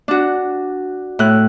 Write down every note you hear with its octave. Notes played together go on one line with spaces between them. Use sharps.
D4 F#4
A2 F#6